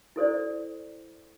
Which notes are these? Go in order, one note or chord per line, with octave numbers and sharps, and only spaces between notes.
E4 A4 C5 D5